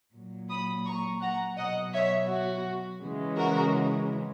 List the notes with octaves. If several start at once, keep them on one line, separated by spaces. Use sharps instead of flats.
A#2 F#3
B5 D#6
A#5 C#6
F#5 A#5
B2 F#3 D#5 F#5
C#5 E5
F#4
C#3 E3 G#3
F#4 A#4